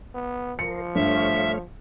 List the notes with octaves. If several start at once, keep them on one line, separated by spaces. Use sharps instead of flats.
B3
F3 A#4 C5 C#7
G2 A3 C#5 E5 F5